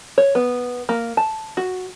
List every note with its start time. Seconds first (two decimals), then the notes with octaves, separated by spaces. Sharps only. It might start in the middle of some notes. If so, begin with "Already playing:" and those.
0.18 C#5
0.35 B3
0.89 A#3
1.17 A5
1.57 F#4